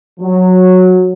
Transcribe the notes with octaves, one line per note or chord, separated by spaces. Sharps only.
F#3